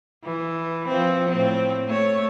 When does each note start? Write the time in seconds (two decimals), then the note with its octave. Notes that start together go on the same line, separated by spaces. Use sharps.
0.24 E3
0.88 F3 C4
1.29 A2 C4
1.87 A3 C#5